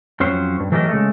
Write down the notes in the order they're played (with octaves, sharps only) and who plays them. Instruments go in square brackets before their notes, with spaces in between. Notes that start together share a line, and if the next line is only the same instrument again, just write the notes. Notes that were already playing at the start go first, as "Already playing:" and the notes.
[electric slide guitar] F2 F#3 C#4 C5
G2
E3 F#3 A3 G4 A#4 D#5
C#3 G#3 A3